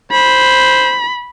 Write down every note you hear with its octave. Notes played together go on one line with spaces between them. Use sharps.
C5 B5